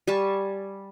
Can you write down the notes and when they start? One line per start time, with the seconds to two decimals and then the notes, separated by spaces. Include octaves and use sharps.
0.07 G3 G#5 A5 C#6